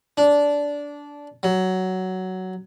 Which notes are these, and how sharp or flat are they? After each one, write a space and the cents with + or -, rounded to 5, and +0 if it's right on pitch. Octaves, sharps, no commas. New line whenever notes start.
D4 -15
F#3 +10